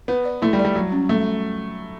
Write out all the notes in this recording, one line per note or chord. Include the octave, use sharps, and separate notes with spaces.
B3 B4
D5
A3 E4
G3
D5
G3
F#3 G3
C#4
G3 A3